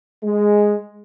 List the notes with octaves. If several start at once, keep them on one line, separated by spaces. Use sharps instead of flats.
G#3